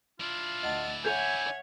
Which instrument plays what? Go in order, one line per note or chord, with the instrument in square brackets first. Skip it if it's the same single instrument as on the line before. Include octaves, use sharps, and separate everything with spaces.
[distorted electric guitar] D4 E4 [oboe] F4
[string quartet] D2 A6 [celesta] D#5 F#5 A5
[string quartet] C#5 E5 F#5 [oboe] G#5 [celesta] G6 F7